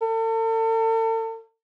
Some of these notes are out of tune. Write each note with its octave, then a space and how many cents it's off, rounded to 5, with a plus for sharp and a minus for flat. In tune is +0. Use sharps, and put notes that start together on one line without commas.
A4 +40